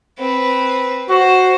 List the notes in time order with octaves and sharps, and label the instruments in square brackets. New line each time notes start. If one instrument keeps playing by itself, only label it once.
[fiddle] C4 B4
[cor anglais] F#4 [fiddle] C5